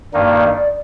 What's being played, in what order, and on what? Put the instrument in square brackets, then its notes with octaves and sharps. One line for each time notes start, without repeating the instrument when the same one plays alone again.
[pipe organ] G2 D#3 A#3 D#4 [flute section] D5